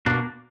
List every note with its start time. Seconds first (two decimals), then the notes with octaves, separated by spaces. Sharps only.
0.06 B2 A#3 D4